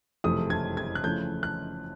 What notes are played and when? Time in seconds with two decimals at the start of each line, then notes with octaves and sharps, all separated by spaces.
0.24 F#1 F2 C3 E3 A3 D#6
0.50 G#6
0.77 G#6
0.95 F#6
1.04 E2 C#3 F3 A3 G6
1.43 F#6